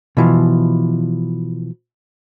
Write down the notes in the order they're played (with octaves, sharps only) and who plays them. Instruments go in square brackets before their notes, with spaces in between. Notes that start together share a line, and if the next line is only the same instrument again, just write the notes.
[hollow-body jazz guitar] B2 E3 F3